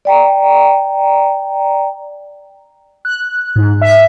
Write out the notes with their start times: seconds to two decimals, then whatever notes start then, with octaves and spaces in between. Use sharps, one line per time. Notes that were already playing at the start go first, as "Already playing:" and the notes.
0.05 D5 G5 A#5
3.05 F#6
3.56 G#2
3.82 E5